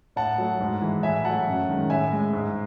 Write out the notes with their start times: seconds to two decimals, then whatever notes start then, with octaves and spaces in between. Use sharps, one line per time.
0.16 A2 F#5 A5
0.38 F#3 A3
0.60 G#2
0.82 E3 G#3
1.03 A2 E5 G#5
1.25 F#3 A3 F#5 A5
1.47 F#2
1.69 D#3 G#3
1.90 A2 E5 G#5
2.12 G#3
2.33 G#2